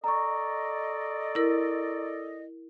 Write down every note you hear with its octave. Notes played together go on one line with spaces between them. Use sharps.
A4 D5 D#5 A#5 C#6
E4 A#4